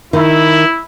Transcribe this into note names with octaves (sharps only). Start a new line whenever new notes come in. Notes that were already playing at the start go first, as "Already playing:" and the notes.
D#3 E4